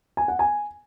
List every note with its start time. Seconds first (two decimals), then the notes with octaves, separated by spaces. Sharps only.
0.17 G#5
0.28 F#5
0.39 G#5